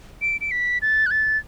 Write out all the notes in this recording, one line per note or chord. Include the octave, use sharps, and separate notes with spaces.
D7
D7
B6
A6
F#6
A6